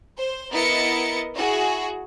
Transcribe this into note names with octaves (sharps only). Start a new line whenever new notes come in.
C5
B3 E4 A#4 D#5 A6 C#7
E4 F#4 G#4